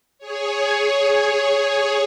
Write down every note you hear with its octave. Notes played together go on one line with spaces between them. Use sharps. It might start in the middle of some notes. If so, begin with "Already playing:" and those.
G#4 C#5